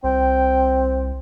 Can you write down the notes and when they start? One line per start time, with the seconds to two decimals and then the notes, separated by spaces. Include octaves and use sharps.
0.04 C2 C4 G5